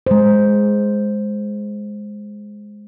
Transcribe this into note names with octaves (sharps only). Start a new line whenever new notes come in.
G#3 C5